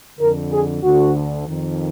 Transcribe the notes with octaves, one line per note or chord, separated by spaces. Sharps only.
F2 D3 A#4
G#4
D2 D3 F#4
F2 D#3